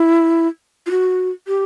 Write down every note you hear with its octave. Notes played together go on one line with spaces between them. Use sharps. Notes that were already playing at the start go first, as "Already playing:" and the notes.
Already playing: E4
F4
F#4
G4